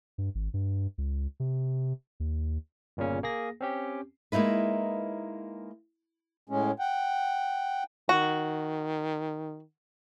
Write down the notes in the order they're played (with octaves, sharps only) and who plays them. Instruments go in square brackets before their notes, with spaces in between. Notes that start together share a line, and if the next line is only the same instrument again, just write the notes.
[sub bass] G2
G#1
G2
C#2
C3
D#2
[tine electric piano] G1 A#2 C#3 C#4
A#3 G#4 A#6
C4 C#4 G4
[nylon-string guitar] G#3 A#3 D#4 E4 B4
[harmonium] A2 G#3 C#4
F#5 G5
[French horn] D#3 [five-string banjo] F#4